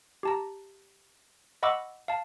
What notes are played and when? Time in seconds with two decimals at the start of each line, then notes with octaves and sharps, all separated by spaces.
0.23 G4 A5 A#5
1.63 D#5 F#5 B5 C#6 D6 E6
2.08 F5 A5